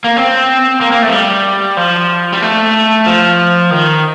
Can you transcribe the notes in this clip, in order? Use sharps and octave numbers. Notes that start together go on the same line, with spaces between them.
A#3
C4
A#3
A#3
A3
F3
G3
F3
G3
A3
F3
D#3